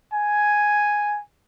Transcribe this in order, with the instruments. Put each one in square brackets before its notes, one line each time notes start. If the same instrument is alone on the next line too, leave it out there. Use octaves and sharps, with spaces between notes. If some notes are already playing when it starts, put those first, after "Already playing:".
[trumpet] G#5